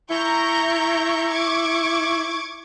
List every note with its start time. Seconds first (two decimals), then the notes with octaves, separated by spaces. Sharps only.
0.10 E4 A#5 C#6 G6
1.28 C#6 D6 G#6